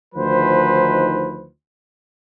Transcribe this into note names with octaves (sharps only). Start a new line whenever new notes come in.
D2 D#3 F3 D#4 B4 C5